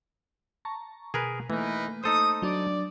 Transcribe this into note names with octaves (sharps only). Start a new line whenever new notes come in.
A5 A#5 C#6
B2 G#4 A#4 B4
E3 A3 A#3 D#4 A#4 B4
D#4 A4 C5 D#6
F#3 D4 D5